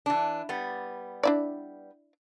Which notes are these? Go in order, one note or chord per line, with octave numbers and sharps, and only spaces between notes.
E3 D4
G3 B3
D4 E4 D5